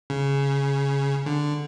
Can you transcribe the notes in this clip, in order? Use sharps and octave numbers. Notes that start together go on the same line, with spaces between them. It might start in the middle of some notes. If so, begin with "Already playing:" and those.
C#3
D3